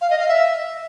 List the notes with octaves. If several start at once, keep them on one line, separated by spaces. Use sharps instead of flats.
F5
D#5
F5
E5